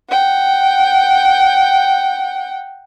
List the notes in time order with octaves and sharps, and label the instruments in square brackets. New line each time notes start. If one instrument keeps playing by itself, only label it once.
[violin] F#5 G5